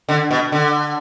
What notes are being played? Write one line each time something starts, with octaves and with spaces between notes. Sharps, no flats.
D3
B2
D3